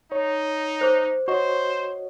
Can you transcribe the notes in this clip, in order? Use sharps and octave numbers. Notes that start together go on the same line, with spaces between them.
D#4 C#5
C5 D6
F#4 C5 C#5 D#5 C#6